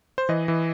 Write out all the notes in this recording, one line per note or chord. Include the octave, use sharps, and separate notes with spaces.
C5
E3 D#5
E3